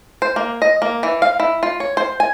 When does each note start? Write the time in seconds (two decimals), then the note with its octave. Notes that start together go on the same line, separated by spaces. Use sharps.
0.22 C5
0.36 A#3
0.62 D#5
0.82 A#3
1.03 E3
1.22 F5
1.40 E4
1.63 F4
1.80 C#5
1.97 C5
2.20 G#5